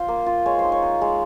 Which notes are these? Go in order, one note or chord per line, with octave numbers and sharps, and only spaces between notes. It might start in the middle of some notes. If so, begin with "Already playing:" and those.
Already playing: F4 C5
A#3
F4
G#3 C#5
C5
D#4
C#5
D#4
G#3